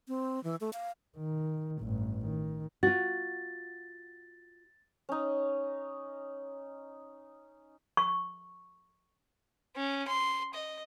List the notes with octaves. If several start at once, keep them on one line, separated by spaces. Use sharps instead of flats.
C4
E3
A3
F5
D#3
A1 G2
D#3
F4 F#4 A6
C#4 D#4
C#6
C#4
C6
D#5